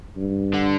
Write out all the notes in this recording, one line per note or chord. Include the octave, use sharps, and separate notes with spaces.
G2
D3